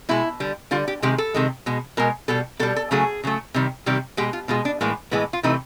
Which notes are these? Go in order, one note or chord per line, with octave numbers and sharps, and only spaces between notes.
B2 G#3 E4
D3 G3
D3 G3 F4
G4
C3 D#3 G#3 G4
A4
C3 D#3 G#3
B2 G#3
B2 G#3 A#4
B2 G3 A4
B2 G3 A4
A4
C#3 F#3 A3 G#4
C#3 F#3 A3
C3 D#3 G3
C3 D#3 G3 G4
B2 G#3 G4
F4
B2 G#3 F4
D4
A2 E3 G#3 A#3
A2 E3 G#3 B3
F4
C3 E3 A3 D#4